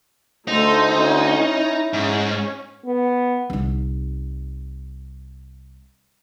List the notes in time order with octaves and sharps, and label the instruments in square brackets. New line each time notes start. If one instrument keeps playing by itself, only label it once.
[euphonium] D2 [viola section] A3 A4 C5 [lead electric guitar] D#4
[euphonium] D2 [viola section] C#4
[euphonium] E4
[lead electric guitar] G#2 [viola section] C#4
[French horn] B3
[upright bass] C2 D#4